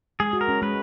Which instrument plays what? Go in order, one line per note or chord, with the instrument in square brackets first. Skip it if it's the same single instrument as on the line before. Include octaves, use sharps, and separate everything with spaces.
[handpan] G#3 [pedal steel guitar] G#4
[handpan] F#4
[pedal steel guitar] A#4
[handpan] C#4
[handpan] G#3 [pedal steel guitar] B4